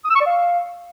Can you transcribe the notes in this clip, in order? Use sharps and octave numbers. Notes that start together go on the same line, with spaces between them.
D#6
E6
C#6
D5
F5